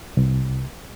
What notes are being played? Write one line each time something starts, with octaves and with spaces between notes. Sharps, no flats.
C2